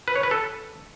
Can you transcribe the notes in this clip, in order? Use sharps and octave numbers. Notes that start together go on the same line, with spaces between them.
B4
C#5
B4
A4